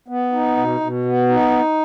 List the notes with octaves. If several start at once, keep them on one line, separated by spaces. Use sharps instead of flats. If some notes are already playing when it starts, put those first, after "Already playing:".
B3
D#4
B2
B2
B3
D#4